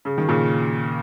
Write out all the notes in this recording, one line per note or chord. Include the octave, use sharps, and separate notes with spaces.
C#3
D#3
A#2 C#3